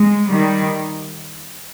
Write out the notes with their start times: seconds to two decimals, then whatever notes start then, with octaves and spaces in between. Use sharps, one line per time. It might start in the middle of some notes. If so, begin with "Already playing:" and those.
Already playing: G#3
0.29 D#3 G3